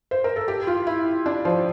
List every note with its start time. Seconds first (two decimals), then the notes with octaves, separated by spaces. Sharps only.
0.11 C5
0.24 A#4
0.36 A4
0.48 G4
0.67 F4
0.87 E4
1.26 D4
1.45 F3